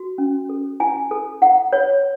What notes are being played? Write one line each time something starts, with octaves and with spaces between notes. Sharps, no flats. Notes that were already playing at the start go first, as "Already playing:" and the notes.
Already playing: F#4
C#4
A4
E4 G#5
A4
E4 F#5
C#5